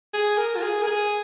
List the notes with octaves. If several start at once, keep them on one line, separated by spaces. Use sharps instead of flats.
G#4
A#4
F4
G#4
A#4
G#4